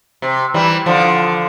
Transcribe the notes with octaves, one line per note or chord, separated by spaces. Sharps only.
C3
E3 G3
D3 F3